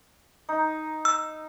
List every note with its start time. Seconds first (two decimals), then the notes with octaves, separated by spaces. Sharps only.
0.49 D#4
1.05 E6